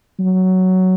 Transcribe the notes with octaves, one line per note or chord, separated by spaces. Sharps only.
F#3